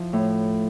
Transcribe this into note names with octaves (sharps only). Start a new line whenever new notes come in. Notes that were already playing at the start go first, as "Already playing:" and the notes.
Already playing: F3 E4
A2